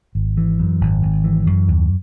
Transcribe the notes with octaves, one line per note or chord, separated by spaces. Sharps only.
G#1
E3
F#2
G#1
G#1
E3
F#2
D#2